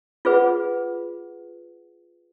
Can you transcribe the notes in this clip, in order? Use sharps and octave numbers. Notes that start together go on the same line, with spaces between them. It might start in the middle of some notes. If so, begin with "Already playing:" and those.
F4 G#4 B4 F#5